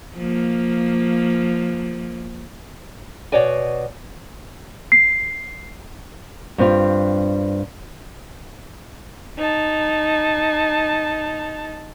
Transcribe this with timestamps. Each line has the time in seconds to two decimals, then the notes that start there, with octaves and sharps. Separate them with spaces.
0.17 F3 A#3
3.32 B2 F#4 C#5 D5 G#5
4.92 C7
6.58 G2 C4 F4
9.38 D#4 A5